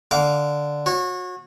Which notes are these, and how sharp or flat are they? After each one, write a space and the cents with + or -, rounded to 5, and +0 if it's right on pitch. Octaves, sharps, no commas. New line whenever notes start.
D3 +0 F5 +0 D6 -30
F#4 -30 C#5 -25